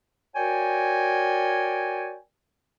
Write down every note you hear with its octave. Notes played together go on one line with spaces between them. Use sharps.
F#4 A#4 C#5 D5 G5 G#5